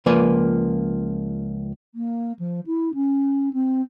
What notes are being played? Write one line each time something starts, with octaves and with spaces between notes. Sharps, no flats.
C#2 F3 A#3 B4 D5 G#5
A#3
F3
E4
C#4
C4